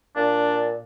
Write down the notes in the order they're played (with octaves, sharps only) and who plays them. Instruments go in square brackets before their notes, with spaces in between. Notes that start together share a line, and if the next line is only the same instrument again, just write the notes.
[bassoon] A#2 [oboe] D4